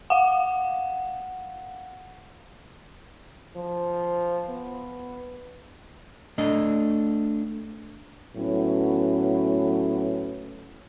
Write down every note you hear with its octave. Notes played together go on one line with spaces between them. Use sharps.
F5 F#5
F3
B3
A3 D4 D#5
A2 F#3 B3 C#4